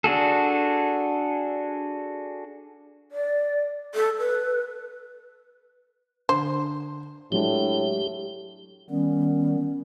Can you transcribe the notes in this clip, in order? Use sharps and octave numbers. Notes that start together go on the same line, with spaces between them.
D4 F#4 G#4 A4
D5
A4
B4
D3 C5
A2 F#3 G#3 D4 G4
D#3 G3 B3 C#4